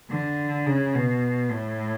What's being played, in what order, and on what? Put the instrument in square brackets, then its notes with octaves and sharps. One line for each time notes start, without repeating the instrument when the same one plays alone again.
[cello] D3
C#3
B2
A2